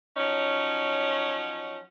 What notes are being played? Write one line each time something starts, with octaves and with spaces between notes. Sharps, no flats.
F3 F#3 C#4 D#4